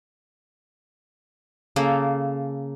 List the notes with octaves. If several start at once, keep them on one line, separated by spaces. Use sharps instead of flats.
C#3 A#3 A4